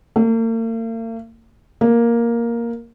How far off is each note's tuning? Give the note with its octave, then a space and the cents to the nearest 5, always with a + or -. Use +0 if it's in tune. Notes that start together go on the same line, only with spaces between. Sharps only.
A#3 -45
A#3 +5